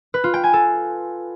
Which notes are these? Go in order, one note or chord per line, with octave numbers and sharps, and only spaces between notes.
B4
F4
G5
G#5
A4